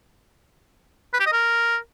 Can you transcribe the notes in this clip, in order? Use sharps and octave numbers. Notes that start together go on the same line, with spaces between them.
B4
G4
D#5
A#4